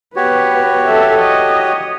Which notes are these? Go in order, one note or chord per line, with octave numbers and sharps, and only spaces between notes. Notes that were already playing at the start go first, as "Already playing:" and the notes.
B3 F#4 G4 B4 C#5
A4 E5
D#5